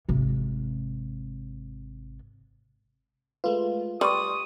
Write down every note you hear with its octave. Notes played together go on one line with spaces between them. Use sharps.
G#1 C3
G#3 A3 F4 B4
G3 B4 D5 C6 C#6 D#6